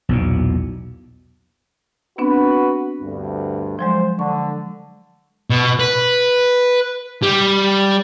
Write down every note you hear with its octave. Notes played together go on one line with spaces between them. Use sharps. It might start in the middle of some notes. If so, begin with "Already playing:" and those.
B1 E2 A#2
B3 C4 D4 F#4 B4
D2 G2
F3 F#3 G#3 C5
D3 C#6
B2
B4
G3